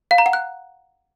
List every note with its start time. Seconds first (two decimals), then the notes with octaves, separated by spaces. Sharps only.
0.11 F5
0.18 A#5
0.26 F#5
0.33 F#6